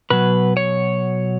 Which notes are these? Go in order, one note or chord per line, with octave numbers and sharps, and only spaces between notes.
B2 F#3 B4
C#5